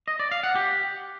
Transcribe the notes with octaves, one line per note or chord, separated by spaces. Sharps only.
D#5
D5
F5
F#5
G4